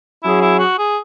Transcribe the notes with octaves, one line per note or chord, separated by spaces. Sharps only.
F#3 C#4 E4 G#4
E4
F#4
G#4